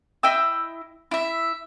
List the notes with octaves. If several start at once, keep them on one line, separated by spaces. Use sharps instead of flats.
E4 D#5 G5 E6
E4 E5